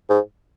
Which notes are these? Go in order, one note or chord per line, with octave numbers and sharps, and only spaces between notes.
G#2